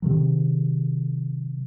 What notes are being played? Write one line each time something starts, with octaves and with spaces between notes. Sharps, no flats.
C3 D#3 F#3